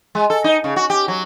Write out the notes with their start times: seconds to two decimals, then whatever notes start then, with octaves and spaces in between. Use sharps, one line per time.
0.15 G#3
0.30 A4
0.44 D#4
0.64 C#3
0.76 F#4
0.90 G4
1.08 F#3